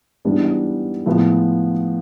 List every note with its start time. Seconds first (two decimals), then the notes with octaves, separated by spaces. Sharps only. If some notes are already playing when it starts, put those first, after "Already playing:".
0.25 G#2 E3 G3 B3 D4
1.06 A2 F3 G#3 B3